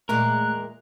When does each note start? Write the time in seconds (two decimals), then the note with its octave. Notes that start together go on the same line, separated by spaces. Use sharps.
0.09 E2 A#2 G#3 A3 A#4 F#6